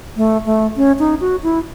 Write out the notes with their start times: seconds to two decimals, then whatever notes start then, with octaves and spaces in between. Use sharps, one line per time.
0.17 A3
0.46 A3
0.77 C#4
0.99 D#4
1.21 F#4
1.43 E4